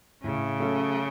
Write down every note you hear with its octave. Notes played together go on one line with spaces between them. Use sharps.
A2 C#3
F#3 A3 C#4 A4